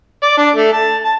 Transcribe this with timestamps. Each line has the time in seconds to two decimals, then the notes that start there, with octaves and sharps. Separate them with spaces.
0.23 D5
0.38 D4
0.55 A3
0.73 A5
1.04 A5